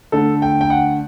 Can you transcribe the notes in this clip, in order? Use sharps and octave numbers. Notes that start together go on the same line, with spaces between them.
D3 A3 D4 A4
G5
G5
F#5